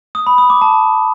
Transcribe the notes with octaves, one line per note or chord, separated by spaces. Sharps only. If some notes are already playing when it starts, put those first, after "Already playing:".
D#6
B5
D#6
D6
A5